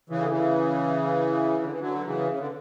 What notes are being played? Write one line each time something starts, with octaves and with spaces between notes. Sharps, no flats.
C#3 E3
D3
C#3 E3
D3
E3
D3 F#3
C#3 E3
C#3
D3